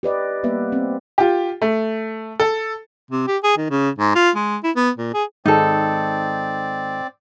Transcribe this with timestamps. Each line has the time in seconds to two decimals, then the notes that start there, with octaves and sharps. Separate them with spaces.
0.03 G4 B4 D5 D#5
0.43 G3 A#3 B3 B4 E5
0.72 C4
1.18 F4 G4
1.62 A3
2.40 A4
3.11 C3
3.28 G4
3.44 G#4
3.57 D#3
3.70 C#3
3.98 G#2
4.15 F4
4.36 G#3
4.63 E4
4.76 B3
4.98 A#2
5.14 G#4
5.46 G#2 D#3 G#3 C4 D#4 A4 D5